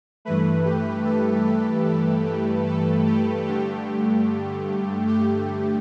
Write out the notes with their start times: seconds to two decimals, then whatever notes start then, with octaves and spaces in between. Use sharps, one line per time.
0.25 G2 E3 A3 B4
0.65 G4
1.05 A4
1.45 B4
1.86 A4
2.26 G4
2.66 A4
3.06 G4
3.46 G2 D3 A3 G4
5.07 G4